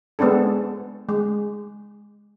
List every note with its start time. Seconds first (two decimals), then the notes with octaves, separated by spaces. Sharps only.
0.19 G#3 B3 C4 D4 A4
1.09 G#3